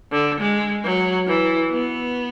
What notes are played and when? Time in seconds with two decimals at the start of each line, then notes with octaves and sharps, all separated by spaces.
0.12 D3
0.40 G#3
0.84 F#3
1.27 E3
1.71 B3